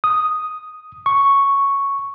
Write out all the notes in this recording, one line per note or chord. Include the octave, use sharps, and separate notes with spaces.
D#6
C#6